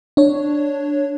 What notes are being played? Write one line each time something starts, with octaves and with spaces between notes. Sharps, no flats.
D4 C#5